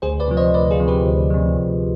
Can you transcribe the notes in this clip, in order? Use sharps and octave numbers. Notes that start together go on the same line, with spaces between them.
D2 G#4 C5
B4 D5
C3 F3
C5 D#5
D2 B4 D5
F4 G#4
C3 F3
G4 B4
D2
C3 F3
D2